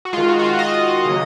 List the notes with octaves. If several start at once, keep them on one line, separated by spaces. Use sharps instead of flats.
F#4
D#3 G#3 F4
F#4
F#4
F4
D#5
C#3 F#3 A#3